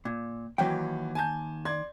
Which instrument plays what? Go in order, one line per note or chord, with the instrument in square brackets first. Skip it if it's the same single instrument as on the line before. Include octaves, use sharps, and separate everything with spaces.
[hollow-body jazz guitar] A#2
[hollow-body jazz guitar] D#2 G5 [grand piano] E3 F#3
[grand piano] G#5 A5 G6
D5 C6 G#6